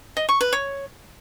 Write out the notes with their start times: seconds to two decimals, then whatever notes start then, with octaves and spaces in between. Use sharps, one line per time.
0.17 D#5
0.29 C#6
0.41 B4
0.53 C#5